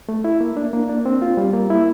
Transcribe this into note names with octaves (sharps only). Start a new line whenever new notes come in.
A3
E4
A#3
D4
A#3
D4
C4
F4
G3
A#3
E4